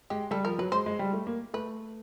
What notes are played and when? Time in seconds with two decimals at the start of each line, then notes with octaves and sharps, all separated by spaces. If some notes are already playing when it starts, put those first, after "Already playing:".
0.10 G#3 G4
0.31 G3 A4
0.45 F3 A#4
0.58 F#3 B4
0.72 G#3 C5
0.86 G#3
0.99 G3
1.13 A3
1.27 A#3
1.54 A3 B4